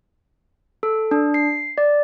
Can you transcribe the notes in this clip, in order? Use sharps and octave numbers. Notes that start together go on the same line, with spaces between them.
A4
D4
C7
D5